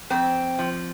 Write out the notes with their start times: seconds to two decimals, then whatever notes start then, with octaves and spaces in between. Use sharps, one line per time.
0.10 F2 C4
0.59 F3